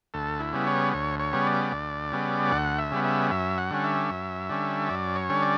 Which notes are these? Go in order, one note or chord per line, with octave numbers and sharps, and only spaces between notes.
D2 A4
E4
C#3 G3 B3
C#5
D2 C#5
C#5
C#3 G3 B3
D5
D2
C#3 G3 B3
D2 F#5
E5
C#3 G3 B3
E5
F#2 E5
F#5
D3 G3 C#4
E5
F#2
D3 G3 C#4
F#2 D5
C#5
D3 G3 C#4
D5